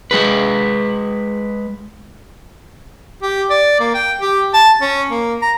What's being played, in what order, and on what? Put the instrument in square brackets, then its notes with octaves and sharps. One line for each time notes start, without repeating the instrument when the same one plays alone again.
[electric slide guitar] G#3 G#4 B4
[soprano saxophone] G4
D5
A#3
G5
G4
A5
C#4
A#3
A#5